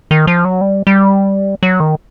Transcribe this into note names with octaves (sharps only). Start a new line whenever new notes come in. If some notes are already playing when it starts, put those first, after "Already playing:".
D#3
F3
F#3
G3
G3
F#3
D#3